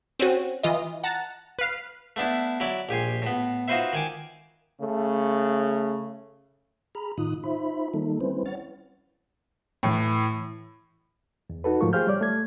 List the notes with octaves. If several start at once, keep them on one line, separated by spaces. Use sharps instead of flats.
C4 C#4 F#4 D#7
E3 F4 D#5
F#5 A5 A#5 A6
B4 F5
A3 B3 D4 E4
F#3 E4 D5
A#1 G4 G#5 C6
A2 B3
D#4 F4 F#4 B4 C5 E5
D#3 G#5 D6
C#3 A3
G#4 A#5 B5 F6
A2 D#3 D#4 F4 D#6 F#6
D#4 F4 C5 E5 B5
D#3 G3 A#3 D#4 A4
G3 C4 C#4 E4 B4 C5
C#5 F#5 F6 A6
A2 E3
E2
D#4 F#4 A4 B4
G#2 F3 A3 F4 A#4 C#6
G4 G#4 C5 F5 F6 G6
G3 C#5 D5 D6
A3 G#6